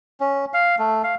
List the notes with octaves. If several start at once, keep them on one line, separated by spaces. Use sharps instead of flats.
C#4
F5
A3
F5